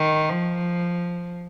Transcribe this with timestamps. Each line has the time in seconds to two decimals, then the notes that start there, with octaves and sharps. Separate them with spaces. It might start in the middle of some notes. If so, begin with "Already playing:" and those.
Already playing: D#3
0.29 F3